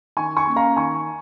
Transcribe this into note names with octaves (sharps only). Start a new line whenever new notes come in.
D#3 G#5 C#6
G#5 C#6
A#3 C#4
F5 A#5
D#3 G#5 C#6